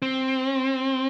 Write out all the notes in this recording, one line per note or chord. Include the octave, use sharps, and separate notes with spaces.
C4